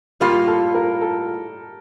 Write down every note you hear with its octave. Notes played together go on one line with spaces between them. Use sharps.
A2 G3 A#3 F4 G4
A4
A#4
A4